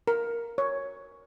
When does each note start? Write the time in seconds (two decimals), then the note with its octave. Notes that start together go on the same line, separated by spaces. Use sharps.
0.07 A#4
0.58 C#5